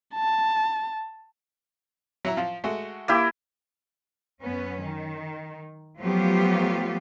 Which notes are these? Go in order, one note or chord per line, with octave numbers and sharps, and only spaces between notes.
A5
F#3 E4 A#5
F3 F4
G#3 A3 F#4
A#3 E4 G4
F#2 B3 C#4
D#3
F3 F#3 A3 B3 F4 G4